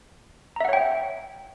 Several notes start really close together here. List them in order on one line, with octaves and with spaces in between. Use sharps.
A#5 E5 F#5 C#5 G5